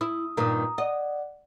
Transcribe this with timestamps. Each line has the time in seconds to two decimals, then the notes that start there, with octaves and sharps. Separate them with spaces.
0.01 E4 D#6
0.37 G2 A#2 D#3 A#5 D#6
0.78 D5 D#5 F#5